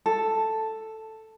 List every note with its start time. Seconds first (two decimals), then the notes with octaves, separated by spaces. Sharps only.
0.06 A4